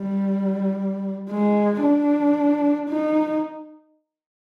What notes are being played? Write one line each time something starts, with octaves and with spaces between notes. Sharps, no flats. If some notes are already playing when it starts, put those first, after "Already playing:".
Already playing: G3
G#3
D4
D#4